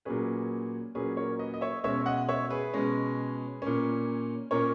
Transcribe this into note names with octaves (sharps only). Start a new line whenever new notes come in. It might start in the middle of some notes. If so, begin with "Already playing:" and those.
A#2 F#3 A#3 C#4 G#4 B4
A#2 F#3 A#3 C#4 G#4 B4
A#4 C#5
B4 D#5
D#5
C#5 E5
B2 G#3 C#4 C#5 E5
D#5 F#5
C#5 E5
G#4 B4
B2 G#3 C#4
A#2 A#3 C#4
A#2 A#3 C#4 A#4 C#5